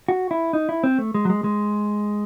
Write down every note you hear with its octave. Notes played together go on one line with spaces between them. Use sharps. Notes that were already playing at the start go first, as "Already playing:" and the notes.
F#4
E4
D#4
E4
C4
A3
G#3
F#3
G#3
G#3